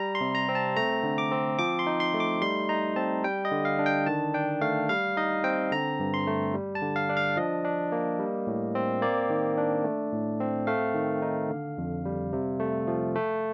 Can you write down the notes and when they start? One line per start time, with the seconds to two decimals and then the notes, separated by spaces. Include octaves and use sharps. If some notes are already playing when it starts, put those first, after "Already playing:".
Already playing: G3 A#5
0.15 C6
0.21 C3
0.35 A#5
0.49 C4
0.55 A5
0.76 A3 A#5
1.04 D3
1.18 D6
1.31 C4
1.59 F3 D6
1.79 C6
1.87 D#4
2.00 C6
2.14 A3
2.20 D6
2.42 G3 C6
2.69 D#4 A#5
2.96 C4 A5
3.24 G3 G5
3.45 D#5
3.52 D3
3.65 F5
3.79 D4
3.86 G5
4.07 D#3 A5
4.34 D4 G5
4.61 A3 F5
4.89 G3 F5
5.17 D#4 D#5
5.44 C4 G5
5.72 D3 A#5
6.00 G2
6.14 C6
6.27 A3
6.54 G3
6.75 A5
6.82 D3
6.96 F5
7.09 D4
7.17 F5
7.37 F3 D#5
7.65 D4
7.92 A#3
8.19 G3
8.47 A2
8.75 C4
9.02 A#3 D5
9.30 D#3
9.58 D4
9.84 A3
10.13 A2
10.40 C4
10.67 A3 F5
10.95 D#3
11.22 D#4
11.50 D3
11.78 F2
12.05 G3
12.33 C3
12.60 A3
12.87 F3
13.15 A3